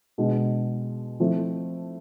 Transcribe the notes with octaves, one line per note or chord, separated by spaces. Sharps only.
B2 G#3 D4
F3 A3 C4 E4